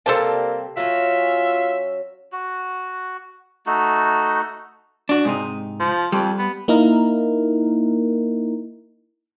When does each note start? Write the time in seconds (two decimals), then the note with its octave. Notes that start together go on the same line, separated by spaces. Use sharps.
0.06 C3 G3 A#3 C4 A4 C5 A5
0.77 F#3 C#4 F4 E5
2.32 F#4
3.66 A3 D#4 F#4
5.09 D4 F#4
5.25 G#2 C3 D#4
5.79 F3
6.12 F2 G3
6.39 B3
6.68 A#3 D#4 E4 A#4